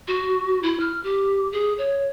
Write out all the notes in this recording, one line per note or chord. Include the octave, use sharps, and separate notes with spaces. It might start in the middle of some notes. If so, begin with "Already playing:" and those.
F#4
E4
F6
G4
G#4
C#5